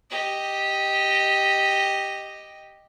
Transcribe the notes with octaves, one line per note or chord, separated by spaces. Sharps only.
G4 D#5